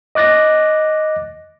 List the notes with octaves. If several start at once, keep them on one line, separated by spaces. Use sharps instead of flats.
D#5 D6 F#6 A6 A#6